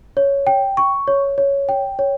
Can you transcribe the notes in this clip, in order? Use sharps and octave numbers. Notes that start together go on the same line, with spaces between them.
C#5
G5
C#6
C#5
C#5
G5
C#5